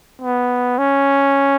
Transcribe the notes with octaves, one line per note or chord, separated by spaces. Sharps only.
B3
C#4